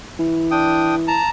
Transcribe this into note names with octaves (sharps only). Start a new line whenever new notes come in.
E3
D4 G5 D#6
A5 A#5